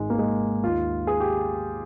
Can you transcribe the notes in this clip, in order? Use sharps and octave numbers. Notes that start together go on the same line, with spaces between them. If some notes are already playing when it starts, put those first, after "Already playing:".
Already playing: G#1 G#2 D#3 G#3
A#3
G#3
D#2 D#3 F4
G#4
G4